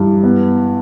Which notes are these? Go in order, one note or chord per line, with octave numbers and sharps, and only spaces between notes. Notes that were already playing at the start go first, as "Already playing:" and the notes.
Already playing: G2 E3
B3